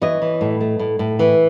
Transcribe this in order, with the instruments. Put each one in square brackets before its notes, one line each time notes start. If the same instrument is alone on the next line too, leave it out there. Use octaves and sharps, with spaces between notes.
[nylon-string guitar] E3 C#5 D#5
E3
A2
A3
A2
A2
E3